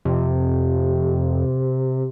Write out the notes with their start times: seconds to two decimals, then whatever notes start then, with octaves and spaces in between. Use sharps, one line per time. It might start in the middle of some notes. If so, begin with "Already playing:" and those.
0.05 F2 C3